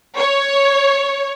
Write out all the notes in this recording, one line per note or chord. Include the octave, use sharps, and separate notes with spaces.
C#5